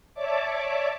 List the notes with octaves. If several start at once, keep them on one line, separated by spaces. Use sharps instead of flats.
C#5 D5 E5 A5 D6